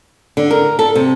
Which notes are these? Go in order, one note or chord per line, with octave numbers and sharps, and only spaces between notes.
D3
A#4
A4
C3